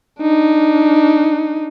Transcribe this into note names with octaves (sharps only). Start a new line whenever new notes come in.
D4 D#4